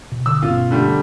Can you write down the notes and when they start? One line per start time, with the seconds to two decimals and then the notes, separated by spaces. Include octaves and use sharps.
0.12 B2
0.26 D3 E6
0.42 G1 B2 C#4 F4
0.71 D3 G3 A3